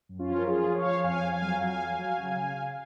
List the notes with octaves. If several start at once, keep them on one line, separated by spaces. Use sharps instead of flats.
F#2
C#4 F4
F3
A#4
F3 F4 G#4
F3
C#5 F5
F3
F2 F5 G#5
F2
F5 G#5
F#3
F2 F5 G#5
F#3
F#3
C#3
C#3
C#3